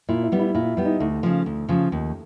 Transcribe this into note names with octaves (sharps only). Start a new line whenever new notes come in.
A#2 E4
E4
G3 B3
E4
A#2 E4
G3 B3
D#4
D2 A3
C#3 F3
D2
C#3 F3
D#2